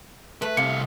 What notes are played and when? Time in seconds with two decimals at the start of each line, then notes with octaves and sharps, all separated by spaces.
0.42 A3 B4
0.57 C2 C3 F5 C#7